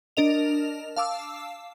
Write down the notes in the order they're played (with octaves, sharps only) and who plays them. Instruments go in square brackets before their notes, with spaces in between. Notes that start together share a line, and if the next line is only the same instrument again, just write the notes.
[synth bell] D4 A#4 D#5 F7
F5 A5 D6 E6